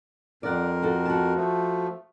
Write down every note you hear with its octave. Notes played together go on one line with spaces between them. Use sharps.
F2 A#4 D5 F#5
F#4 A4
F#4 A5
F3 A3